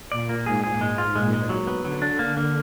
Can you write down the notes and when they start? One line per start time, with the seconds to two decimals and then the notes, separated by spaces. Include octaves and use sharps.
0.12 A#2 D5
0.29 A#3
0.46 G#2 G#4
0.64 G#4
0.81 G#3
0.98 F4
1.16 A#2 G#3
1.33 G#3
1.49 F#3
1.67 B3
1.84 D3 F#3
2.02 D4
2.19 A#3
2.37 A#3